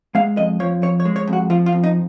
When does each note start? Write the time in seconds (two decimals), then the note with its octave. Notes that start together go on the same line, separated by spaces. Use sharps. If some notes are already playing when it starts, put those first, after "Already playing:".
0.15 G#3 F5
0.37 F2 D#5
0.60 F3 C#5
0.82 F2 C#5
1.00 C#5
1.05 G#3
1.16 C#5
1.27 F2
1.33 F#4
1.50 F3 F4
1.66 F4
1.72 F2
1.84 D#4